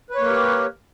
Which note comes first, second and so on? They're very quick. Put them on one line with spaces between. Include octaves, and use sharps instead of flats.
B4 C#5 A#3 A#4 G4